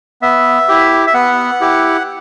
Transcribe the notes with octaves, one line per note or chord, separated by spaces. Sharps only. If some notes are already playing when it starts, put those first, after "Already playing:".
B3 E5
E4 G4
E5
B3 F#5
E4 G4